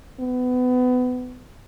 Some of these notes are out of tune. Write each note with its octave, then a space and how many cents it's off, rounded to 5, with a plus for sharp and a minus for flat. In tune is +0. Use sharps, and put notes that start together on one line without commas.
B3 +25